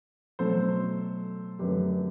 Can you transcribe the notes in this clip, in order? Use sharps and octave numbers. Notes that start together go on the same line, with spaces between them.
B2 F#3 A3 A4 C5
F#2 D3 F#3 A3 G4 B4